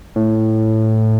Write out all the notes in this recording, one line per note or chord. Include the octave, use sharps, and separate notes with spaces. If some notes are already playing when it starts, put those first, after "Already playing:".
A2